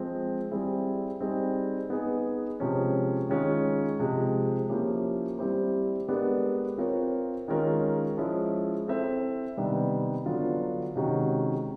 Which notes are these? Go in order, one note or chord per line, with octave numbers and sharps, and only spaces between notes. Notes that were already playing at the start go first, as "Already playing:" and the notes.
Already playing: F3 G#3 C4
G3 C4 E4 G#4
G3 C4 D#4 G#4
B3 D#4 G#4
C3 F3 G#3 C#4
D#3 G#3 C#4 F4
C3 F3 G#3
F3 A#3 C#4 E4 G4
G3 C4 E4 G4 C5
G#3 B3 D4 G4 A#4
C4 F4 A#4 C#5
D#3 G#3 C#4 F4 A#4
F3 G#3 C#4 E4
C4 E4 A4 C5 E5
C3 D#3 G3 B3 D4
D3 F#3 B3 D4 F4
C3 D#3 G#3 C#4 F#4